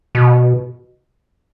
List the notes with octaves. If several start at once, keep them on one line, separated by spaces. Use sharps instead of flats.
B2